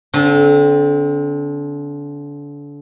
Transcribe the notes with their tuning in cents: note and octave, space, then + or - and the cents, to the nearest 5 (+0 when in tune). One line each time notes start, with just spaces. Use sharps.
D3 -30 C4 +0